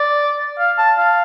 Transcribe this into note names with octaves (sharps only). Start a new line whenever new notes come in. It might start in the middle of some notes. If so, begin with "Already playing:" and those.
Already playing: D5
F5
A5
F5